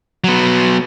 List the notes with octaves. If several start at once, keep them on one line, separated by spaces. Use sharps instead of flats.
F#3 B3